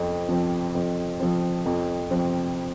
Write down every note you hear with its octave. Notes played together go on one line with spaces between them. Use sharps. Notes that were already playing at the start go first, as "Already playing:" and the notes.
Already playing: F2 F3 C4
F3 C4
F2
F3 C4
F2
F3 C4